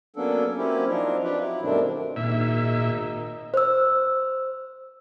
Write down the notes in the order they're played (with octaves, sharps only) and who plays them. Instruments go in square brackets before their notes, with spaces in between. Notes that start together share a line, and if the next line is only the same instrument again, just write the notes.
[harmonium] F#3 A#3 B3 C#4 D4 A4
F#3 A#3 C4 C#4 E4 G4
F3 C4 D4 D#4
D4 F4 G4 B4
F#3 E4
G2 B2 D#3 A3 C4 D4
[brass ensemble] G#1 D#3 D#4 [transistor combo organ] A#2 E5
[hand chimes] C5 E6